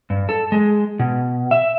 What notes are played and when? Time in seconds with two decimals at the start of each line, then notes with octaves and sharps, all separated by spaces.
0.10 G2
0.29 A4
0.52 G#3
0.99 B2
1.51 E5